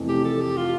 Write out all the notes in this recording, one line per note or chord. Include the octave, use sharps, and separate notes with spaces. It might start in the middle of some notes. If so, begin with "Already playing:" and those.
Already playing: F1 F2 E3 A3
G4
A4
G4
F4